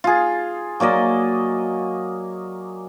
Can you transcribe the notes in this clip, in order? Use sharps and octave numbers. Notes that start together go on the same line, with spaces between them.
F4 G#4
F#3 A#3 D5 D#5